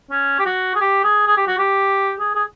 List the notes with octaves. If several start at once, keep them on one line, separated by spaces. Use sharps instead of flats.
C#4
G4
F#4
G#4
G4
G#4
G#4
G4
F#4
G4
G#4
G#4